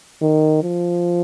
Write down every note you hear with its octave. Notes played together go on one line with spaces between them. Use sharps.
D#3
F3